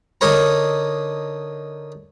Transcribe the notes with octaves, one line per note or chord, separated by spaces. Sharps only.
D3 D4 D#4 A#4 C#5 A#5